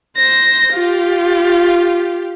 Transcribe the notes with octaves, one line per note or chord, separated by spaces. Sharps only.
C5 A#6
F4 G4